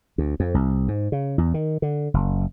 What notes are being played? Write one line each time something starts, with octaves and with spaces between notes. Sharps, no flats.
D2
F2
C2
G#2
C#3
E2
D#3
D3
F#1